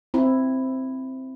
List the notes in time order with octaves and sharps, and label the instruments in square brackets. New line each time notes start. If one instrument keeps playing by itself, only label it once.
[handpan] C4 E4